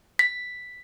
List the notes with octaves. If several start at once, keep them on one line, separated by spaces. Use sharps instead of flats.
B6